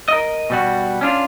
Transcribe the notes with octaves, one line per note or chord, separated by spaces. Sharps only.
A#4 D#5
B2 G3 F#4
C#4 D4 F4